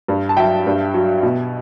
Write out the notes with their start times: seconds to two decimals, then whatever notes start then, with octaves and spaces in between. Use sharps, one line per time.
0.08 G2
0.29 A5
0.37 F#3 E5 G5
0.67 G2
0.94 F#3
1.23 B2